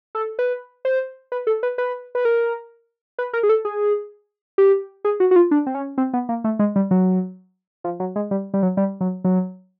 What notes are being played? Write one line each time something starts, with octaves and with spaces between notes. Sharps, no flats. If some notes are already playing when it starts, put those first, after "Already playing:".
A4
B4
C5
B4
A4
B4
B4
B4
A#4
B4
A#4
G#4
A4
G#4
G4
G#4
F#4
F#4
F4
D4
C4
C#4
C4
B3
A#3
A3
G#3
G3
F#3
F3
F#3
G#3
G3
G3
F#3
G3
F#3
F#3